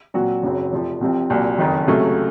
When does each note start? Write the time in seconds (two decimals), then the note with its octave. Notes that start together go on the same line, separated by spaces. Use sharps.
0.14 A#2 F#3 C4 F#4
0.43 F#1 F#2 C#3 F#3 C4
0.72 F1 F2 C3 F3
1.01 C2 C3 F3 C4
1.30 C2 A#2 F#3
1.58 F#1 F2 D#3
1.87 C#2 C3 F#3 A3 C#4